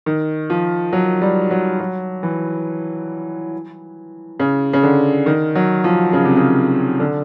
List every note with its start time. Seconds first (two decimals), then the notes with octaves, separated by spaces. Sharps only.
0.06 D#3
0.50 F3
0.93 F#3
1.22 G3
1.51 F#3
1.80 F#3
2.23 E3
4.40 C#3
4.73 C#3
4.83 D3
5.26 D#3
5.55 F#3
5.84 F3
6.13 C#3
6.25 C3
6.37 C#3
7.00 D3